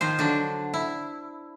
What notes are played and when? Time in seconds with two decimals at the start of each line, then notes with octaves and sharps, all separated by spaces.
0.01 D#3 F3 C5
0.19 D3 F#3 D4
0.74 E4